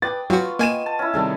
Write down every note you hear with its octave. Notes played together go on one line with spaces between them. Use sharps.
B4 D5 G5 D#6 A6
F#3 B3 F4 F#4 G5 C#6
A#3 D#5 G#5 D#7 E7
A5
C#4 E4
C3 D#3 G3 G#4 A4